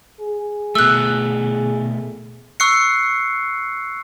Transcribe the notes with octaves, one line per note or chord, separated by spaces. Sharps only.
G#4
B2 A3 E6 F#6
C#6 E6 F#6 C7 C#7